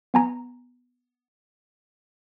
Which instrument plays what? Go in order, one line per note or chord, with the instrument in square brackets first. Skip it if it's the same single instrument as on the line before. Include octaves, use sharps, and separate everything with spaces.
[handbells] B3 G#5 A#5